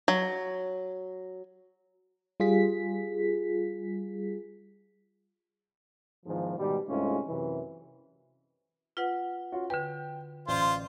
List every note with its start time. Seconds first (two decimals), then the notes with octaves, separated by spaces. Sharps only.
0.08 F#3
2.40 G3 F4 G#4 B6
6.25 E2 G#2 D#3 F3
6.58 G#2 B2 D#3 G3
6.88 C2 G#2 G#3 A3 C#4 F4
7.28 F#2 C3 E3
8.97 F4 B4 F#5
9.52 C#4 F4 F#4
9.70 D3 B4 G5
10.48 A1 F4 C5 D5